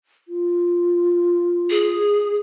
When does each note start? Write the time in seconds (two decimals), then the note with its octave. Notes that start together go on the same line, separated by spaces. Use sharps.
0.28 F4
1.70 G#4